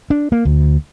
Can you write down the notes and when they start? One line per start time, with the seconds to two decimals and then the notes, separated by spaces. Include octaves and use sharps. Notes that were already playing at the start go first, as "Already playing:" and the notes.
0.10 D4
0.32 A#3
0.45 D2